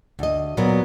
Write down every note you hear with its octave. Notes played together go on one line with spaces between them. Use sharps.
D2 D#5
A#2 F#3 B3 A#4